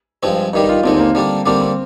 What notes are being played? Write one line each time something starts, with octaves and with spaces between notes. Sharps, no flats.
G2 F3 G#3 C4
G2 D#3 G3 D#4
D#4
F4
D#2 D3 G#3 C4
C4
A#3
D3 G3 D4
D3 G3 A#3 C4 D4
C4